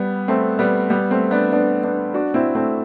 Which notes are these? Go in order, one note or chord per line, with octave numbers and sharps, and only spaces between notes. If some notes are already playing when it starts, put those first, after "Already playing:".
Already playing: G3 B3
A3 C4
G3 B3
G3 B3
A3 C4
B3 D4
B3 D4
B3 D4
D4 F#4
C4 E4
A3 C4